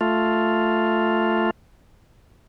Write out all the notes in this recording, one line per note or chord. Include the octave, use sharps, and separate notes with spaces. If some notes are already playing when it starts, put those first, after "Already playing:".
A3 F4